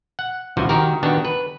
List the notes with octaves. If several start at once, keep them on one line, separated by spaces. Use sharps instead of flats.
F#5
C#2 C3 E3 F3 F#4
D#3 F#4 G4 A#4
D#3 B3 D4 F#4 G4
B4